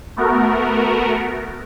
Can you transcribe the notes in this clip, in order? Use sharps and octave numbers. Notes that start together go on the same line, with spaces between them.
A3 B3 F#4 A#4